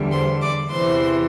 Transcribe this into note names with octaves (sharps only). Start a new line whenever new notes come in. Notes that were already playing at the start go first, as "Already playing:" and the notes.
Already playing: E2 D3 G3
C5 C6
D5 D6
E2 C3 E3 C5 C6